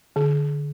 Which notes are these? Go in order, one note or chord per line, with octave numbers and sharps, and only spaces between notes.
D3